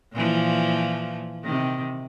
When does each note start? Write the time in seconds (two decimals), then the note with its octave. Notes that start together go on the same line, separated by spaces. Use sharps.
0.13 A#2 E3 F3
1.44 C3 D#3